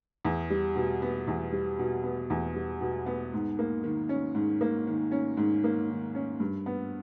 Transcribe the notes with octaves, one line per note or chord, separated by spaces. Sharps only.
E2
G3
B2
B3
E2
G3
B2
B3
E2
G3
B2
B3
G#2
A#3
D#3
C#4
G#2
A#3
D#3
C#4
G#2
A#3
D#3
C#4
G2
B3